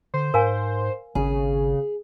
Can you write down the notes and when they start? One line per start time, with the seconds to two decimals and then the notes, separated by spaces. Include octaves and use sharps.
0.14 D3 C5
0.34 G#2 A#4 F5 G#5
1.15 G#1 C#3 G#4